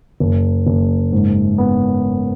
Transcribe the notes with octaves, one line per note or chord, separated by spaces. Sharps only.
F#1
F#1
G#2
B3